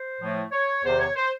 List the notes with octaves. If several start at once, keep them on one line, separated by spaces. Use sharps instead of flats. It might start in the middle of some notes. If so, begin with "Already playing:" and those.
Already playing: C5
A2 F3 A3
C#5
E2 C3 D#3 C5
C#5
C5